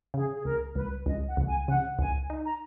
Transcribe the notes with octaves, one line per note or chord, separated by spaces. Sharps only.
C#3 G#4
G#4
C#2 A#4
C#2 B4
C#2 D#5
F#5
C#2
G#5
C#3 F#5
C#2 G#5
D#4
A#5